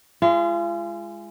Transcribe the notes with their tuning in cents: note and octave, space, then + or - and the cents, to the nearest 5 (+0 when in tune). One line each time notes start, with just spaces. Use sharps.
G#3 +0 F4 -35